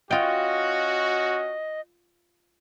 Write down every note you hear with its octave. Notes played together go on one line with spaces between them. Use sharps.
C#4 F4 F#4 D#5 G5